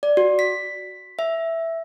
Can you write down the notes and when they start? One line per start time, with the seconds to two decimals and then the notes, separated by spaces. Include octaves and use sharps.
0.03 D5
0.17 F#4
0.39 B6
1.19 E5